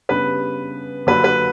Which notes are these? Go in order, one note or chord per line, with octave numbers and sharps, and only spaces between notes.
C#3 G3 B3 D4 B4
D3 F#3 A#3 D4 B4
B4